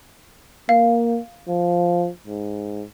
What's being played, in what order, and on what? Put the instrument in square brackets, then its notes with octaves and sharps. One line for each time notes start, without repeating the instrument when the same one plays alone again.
[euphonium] A#3 [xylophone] F5
[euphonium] F3
G#2